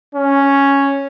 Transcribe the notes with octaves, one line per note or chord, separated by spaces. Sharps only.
C#4